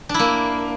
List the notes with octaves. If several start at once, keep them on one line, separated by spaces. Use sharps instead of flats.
D4
E4
A#3